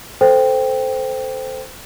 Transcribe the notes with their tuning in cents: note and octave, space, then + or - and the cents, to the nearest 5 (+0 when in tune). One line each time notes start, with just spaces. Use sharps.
A4 +0 C5 -15 G5 +0